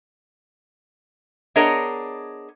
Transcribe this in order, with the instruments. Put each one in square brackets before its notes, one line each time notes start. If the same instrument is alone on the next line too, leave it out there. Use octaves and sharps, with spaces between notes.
[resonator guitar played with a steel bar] B3 D4 G#4 A#4 C#5 D#5